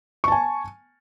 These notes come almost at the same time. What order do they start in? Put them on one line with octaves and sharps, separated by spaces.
C#6 A5 G#5